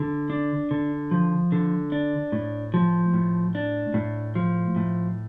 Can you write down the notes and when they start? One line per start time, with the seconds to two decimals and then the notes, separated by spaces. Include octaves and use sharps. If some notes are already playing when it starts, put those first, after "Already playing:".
Already playing: D3
0.30 D4
0.71 D3
1.11 F3
1.52 D3
1.92 D4
2.32 A2
2.74 F3
3.13 A2
3.55 D4
3.94 A2
4.36 F3
4.76 A2